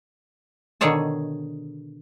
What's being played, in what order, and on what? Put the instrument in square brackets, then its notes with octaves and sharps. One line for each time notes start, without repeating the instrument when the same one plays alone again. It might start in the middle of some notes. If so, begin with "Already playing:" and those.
[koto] B2 D3 D#3 G#4 C#5 A5